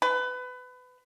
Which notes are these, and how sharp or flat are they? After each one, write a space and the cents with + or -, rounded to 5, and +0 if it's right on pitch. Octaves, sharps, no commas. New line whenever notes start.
B4 +25